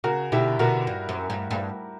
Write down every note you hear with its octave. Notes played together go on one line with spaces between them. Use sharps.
C#3 F#4 A#4
B2 D3 E4 G4
B2 D3 F#4 A#4
G2
F#2
G2
G2